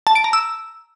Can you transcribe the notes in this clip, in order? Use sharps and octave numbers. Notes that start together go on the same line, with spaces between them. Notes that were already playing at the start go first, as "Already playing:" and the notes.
A5
D7
A#5
E6